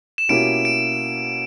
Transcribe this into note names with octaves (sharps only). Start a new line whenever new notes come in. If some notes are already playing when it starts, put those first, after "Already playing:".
E7
B2 A#3 C#4 E4 G4 D7
D7